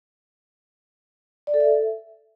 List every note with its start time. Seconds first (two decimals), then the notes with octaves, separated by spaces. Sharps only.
1.47 D5
1.54 A4
1.60 E5